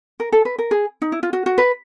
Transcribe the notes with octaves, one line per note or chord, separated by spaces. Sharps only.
A#4
A4
B4
A#4
G#4
D#4
E4
F4
F#4
F#4
B4